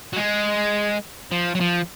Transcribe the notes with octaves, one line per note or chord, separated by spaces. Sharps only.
F#3
G#3
F3
F#3
F3